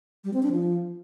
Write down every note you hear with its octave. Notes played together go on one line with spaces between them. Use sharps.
G3
C4
D4
F3